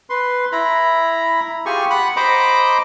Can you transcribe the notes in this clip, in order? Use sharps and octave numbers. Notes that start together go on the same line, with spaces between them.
B4 C6
E4 A#5 B5
F4 G4 G#4 G#5 C#6
F#5 B5 F#6
C5 D#5 A#5 B5 D6